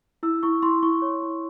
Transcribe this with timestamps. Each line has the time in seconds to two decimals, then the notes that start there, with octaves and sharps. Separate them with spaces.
0.23 E4 E6
0.43 E4 C#6
0.62 E4 C6
0.83 E4 C#6
1.02 C#5
1.23 E4